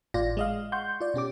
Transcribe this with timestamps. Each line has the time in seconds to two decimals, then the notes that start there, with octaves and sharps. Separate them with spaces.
0.14 G#1 A2 F4 D5 A#6
0.37 G#3 D#5 F5
0.72 F#5 C6 C#6 G6
1.01 F4 D5
1.14 B2 C#4 G4 D6